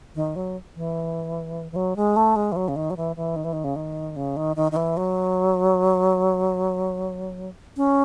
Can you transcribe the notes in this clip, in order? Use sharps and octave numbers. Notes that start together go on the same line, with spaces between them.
D#3
F#3
E3
E3
F#3
G#3
A3
G#3
E3
F#3
C#3
D#3
F#3
E3
E3
D#3
E3
D#3
C#3
D#3
C#3
D#3
D#3
D#3
E3
F#3
C#4